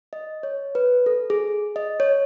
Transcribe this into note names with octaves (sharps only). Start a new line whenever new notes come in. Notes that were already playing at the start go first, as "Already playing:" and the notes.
D#5
C#5
B4
A4
G#4
D#5
C#5